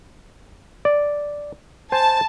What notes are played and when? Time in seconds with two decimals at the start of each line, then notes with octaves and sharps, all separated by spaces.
0.85 D5
1.92 C5 G#5 A5